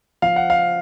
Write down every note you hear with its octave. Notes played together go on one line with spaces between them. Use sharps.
F3 F5
F#5
F5